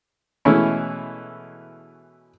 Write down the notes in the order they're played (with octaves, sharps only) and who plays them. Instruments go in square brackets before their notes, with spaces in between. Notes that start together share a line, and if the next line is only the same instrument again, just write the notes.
[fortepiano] B2 E3 G#3 A3 C#4 E4